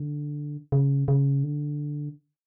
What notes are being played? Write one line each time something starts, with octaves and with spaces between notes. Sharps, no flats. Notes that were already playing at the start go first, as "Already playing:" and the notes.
Already playing: D3
C#3
C#3
D3